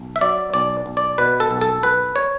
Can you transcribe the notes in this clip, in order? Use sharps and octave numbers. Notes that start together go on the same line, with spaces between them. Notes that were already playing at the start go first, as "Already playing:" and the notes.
Already playing: B1
E5
F#3 D5
B1 D5
B1
D5
B2 B4
A4
B1
A4
B1 B4
C#5